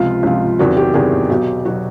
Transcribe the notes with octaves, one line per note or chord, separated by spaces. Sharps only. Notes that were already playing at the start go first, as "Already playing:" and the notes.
Already playing: C#2 C3 F3 F4
C#2 C3 F3
E2 C3 D#3 F#3 F#4
G4
E2 C3 D#3 F#3 G#4
B1 B2 F#3 G4
B2 F#3 F#4